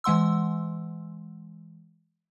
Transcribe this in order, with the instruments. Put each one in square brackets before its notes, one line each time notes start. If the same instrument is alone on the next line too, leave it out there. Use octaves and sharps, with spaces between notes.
[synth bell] E3 G#3 F#5 C6 E6